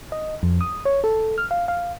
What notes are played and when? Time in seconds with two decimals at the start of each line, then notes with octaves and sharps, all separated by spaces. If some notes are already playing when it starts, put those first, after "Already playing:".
0.12 D#5
0.43 F2
0.61 D#6
0.85 C#5
1.04 A4
1.38 F6
1.51 F5
1.68 F5